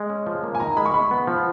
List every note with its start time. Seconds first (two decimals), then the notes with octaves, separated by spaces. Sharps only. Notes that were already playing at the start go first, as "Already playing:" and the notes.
Already playing: G#3
0.10 C#4
0.27 F3
0.43 A#3
0.55 G#5
0.60 D#3 A#5
0.77 G#3 B5
0.86 C#6
0.94 G#3 B5
1.11 B3
1.27 F3